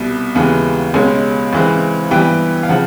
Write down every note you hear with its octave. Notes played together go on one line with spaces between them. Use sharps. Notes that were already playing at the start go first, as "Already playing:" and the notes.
Already playing: C2 B2 G3
D#2 C#3 E3 G#3 B3
C#2 B2 G#3 C#4 G#5
C#2 C#3 E3 G#3 C4
G2 E3 G3 B3 G5
F5
C#3 F3 F#5